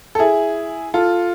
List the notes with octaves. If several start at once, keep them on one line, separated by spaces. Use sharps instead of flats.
A4
E4 G#4
F4 A4